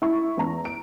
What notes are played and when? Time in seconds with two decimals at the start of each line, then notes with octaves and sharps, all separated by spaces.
0.02 E4 C#6
0.37 E2 A#5
0.65 D7